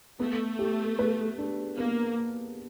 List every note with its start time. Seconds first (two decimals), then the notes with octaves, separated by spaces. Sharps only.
0.19 A3 B3
0.59 G4
0.99 B4
1.38 D4
1.78 A#3 B3